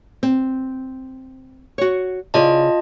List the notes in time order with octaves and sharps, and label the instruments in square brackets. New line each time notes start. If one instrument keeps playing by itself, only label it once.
[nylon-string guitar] C4
F#4 C#5
[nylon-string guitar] C#3 E4 D5 [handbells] F4 D#5 A5